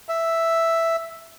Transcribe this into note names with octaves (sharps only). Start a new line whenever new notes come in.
E5